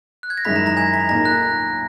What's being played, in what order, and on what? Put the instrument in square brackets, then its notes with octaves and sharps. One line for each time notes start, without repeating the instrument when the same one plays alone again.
[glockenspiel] F#6
G#6
A#6
[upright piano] F#2 D#3 G#3 C#4 E4 [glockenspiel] B5 B6
[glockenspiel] A#5 A#6
A#5 A#6
G#5 G#6
B5 B6
[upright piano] B1 A#2 A#3 D#4 [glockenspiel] A#5 A#6
[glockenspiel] F#6